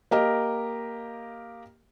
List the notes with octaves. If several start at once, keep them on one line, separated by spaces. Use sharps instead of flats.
A#3 G4 A#4 D#5